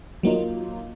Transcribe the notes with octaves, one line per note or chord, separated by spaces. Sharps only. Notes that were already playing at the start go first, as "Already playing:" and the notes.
F#3 A#3 D#4 F4